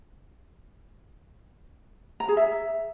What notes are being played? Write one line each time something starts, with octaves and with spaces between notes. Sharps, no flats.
A#5
G#4
E5